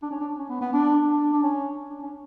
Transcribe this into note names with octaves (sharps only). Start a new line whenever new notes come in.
D4
C#4
D4
C#4
B3
B3
D4
D4
D4
C#4
D4
C#4